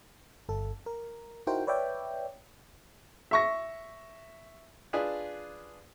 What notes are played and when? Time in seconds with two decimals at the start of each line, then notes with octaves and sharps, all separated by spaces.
0.49 G1 A4
0.86 A#4
1.47 D#4 E4 F#4 A#4 C5 G5
1.67 B4 C#5 D5 E5 G5
3.31 E5 C#6 A#6
4.93 D4 F4 G#4 B4 D5